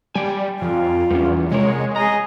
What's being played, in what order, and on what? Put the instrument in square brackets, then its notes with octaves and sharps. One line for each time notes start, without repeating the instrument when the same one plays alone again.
[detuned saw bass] G3 [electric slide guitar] D5 G5 G#5
[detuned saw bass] F2 [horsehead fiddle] F4
[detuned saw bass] E2 [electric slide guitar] G3 C#4
[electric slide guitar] C3 A#4 [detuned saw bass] G#3 [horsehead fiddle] C#5
[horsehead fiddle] G#4 D#5 [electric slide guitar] A#5